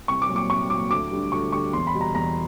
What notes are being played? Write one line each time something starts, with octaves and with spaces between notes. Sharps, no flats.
C2 C#6
D6
A#2 F#3
D6
C2 C#6
A#2 F#3 D6
D2 D6
D3 G3
D2 C#6
D3 G3 C#6
E2 C6
B5
B2 G3
A#5
E2 A#5